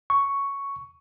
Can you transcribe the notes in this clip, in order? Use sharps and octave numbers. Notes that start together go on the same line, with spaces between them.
C#6